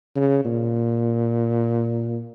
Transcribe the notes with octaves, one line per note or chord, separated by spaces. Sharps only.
C#3
A#2